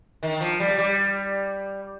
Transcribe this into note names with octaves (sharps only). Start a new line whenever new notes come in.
D#3
F3
G3
G3